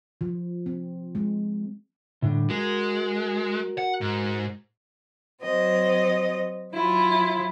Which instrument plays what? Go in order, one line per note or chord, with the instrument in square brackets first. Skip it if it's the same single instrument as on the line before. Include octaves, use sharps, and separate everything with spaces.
[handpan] F3
C4
G#3
[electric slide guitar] A2 D3 G3
[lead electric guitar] G#3 [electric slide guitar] F#4 A#4
[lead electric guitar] F#5
G#2
[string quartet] F#3 C4 D#5
F#3 E4 F4